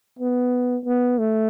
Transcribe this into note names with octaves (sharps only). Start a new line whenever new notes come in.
B3
B3
A3